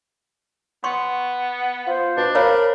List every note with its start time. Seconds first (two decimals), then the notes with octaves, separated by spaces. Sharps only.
0.84 B3 C6 C#6
1.87 F4 C5
2.17 B2 D4
2.35 A#4 C5 C#5 F5 B5